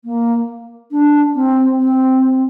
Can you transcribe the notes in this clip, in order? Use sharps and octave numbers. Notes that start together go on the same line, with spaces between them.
A#3
D4
C4
C4